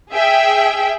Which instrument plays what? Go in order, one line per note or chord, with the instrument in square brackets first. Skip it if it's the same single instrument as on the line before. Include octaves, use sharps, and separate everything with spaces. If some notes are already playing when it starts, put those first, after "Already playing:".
[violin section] G#4 E5 G5